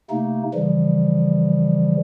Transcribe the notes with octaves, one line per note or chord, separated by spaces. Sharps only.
C3 A3 A#3 D#4
C#3 E3 F3 G3